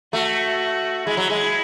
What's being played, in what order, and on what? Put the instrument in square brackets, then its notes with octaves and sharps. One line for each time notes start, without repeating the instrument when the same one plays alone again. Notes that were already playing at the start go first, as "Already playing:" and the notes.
[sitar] A3 [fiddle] F#4
[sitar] G#3 [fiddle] E4
[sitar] F#3
G#3